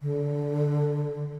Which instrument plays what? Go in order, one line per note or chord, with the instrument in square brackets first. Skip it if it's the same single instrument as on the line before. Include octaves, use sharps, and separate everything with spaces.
[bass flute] D3